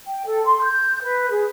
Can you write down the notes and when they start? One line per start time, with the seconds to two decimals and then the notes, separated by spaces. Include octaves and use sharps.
0.07 G5
0.26 A4
0.45 C6
0.63 G6
1.02 B4
1.30 G#4